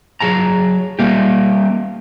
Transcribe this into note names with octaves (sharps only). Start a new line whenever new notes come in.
F#3 G#4 A5 A#5
G3 A#3 G4